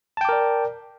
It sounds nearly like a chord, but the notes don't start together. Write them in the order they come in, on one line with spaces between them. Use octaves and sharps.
A5 G5 D6 A#4 D5